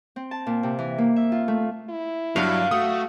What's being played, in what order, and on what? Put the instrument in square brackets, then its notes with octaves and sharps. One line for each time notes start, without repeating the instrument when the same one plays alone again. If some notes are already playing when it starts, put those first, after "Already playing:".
[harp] C4
A5
A#2
C3
E3
A#3
E5
F4
A3
[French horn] E4
[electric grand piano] G2 D4 [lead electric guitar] F#3 [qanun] F5
[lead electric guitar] A3 [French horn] F#4 [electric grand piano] D#6